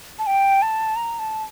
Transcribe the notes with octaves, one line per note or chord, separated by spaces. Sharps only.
A5
G5
A5
A#5
A5